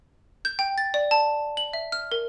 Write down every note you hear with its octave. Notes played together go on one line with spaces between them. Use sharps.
G6
G5
A6
D5
A5
F#7
E5
F6
A#4